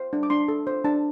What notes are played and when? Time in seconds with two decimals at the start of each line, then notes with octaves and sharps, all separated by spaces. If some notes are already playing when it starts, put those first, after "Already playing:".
Already playing: C5
0.13 D4
0.23 D6
0.30 D4 C6
0.48 A4
0.67 C5
0.84 D4 A5